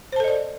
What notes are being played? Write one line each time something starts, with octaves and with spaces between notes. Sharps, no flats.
A4 C5 D5 D#5 A5